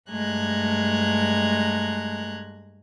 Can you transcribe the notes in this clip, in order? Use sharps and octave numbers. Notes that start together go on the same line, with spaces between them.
G2 G#3 A3 A#5 F#6 G#6